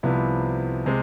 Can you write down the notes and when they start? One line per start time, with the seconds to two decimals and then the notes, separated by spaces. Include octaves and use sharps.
0.03 C2 C3 F3 B3 E4
0.86 C3 G#3